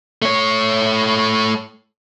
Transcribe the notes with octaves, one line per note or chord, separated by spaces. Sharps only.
A3 C#5